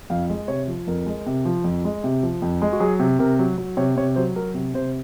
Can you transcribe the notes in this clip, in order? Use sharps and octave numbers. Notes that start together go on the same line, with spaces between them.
F2 F5
G#3
C3 C#5
F3
F2 A#4
G#3
C3
F3
F2
G#3
C3
F3
F2
G#3
F#4
F#3 G#4
C3
C3 A#4
F#3
F#3
C3 C#5
C3 C#5
F#3 C5
F#3 A#4
C3
C3 C5